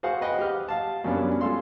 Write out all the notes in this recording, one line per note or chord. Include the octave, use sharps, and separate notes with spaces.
F#4 G#4 C5 F5 F#5
B4 D#5 F#5 G5
G4 F6
F5 A5
F#2 G3 A#3 B3 C#4 D4
G#3 F4 A4 F5 C6